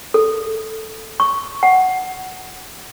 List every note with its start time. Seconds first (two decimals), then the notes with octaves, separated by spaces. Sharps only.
0.14 A4
1.20 C#6
1.63 F#5